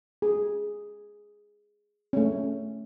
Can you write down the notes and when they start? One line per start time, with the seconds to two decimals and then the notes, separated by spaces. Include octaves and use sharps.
0.22 G#4
2.13 A3 C#4